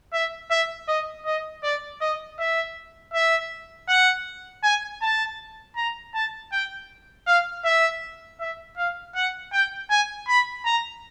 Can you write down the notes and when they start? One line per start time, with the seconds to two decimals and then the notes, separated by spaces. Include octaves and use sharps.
0.13 E5
0.51 E5
0.88 D#5
1.26 D#5
1.63 D5
2.01 D#5
2.39 E5
3.14 E5
3.89 F#5
4.64 G#5
5.02 A5
5.77 A#5
6.14 A5
6.52 G5
7.27 F5
7.65 E5
8.40 E5
8.77 F5
9.15 F#5
9.53 G5
9.90 G#5
10.28 B5
10.66 A#5